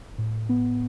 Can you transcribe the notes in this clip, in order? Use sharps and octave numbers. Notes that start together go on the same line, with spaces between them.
A2
B3